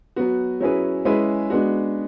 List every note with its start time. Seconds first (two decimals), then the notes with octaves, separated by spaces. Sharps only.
0.16 F#3 B3 F#4
0.61 F#3 C#4 E4 G#4 B4
1.05 G#3 C#4 E4 G#4 B4
1.50 G#3 B3 D4 F#4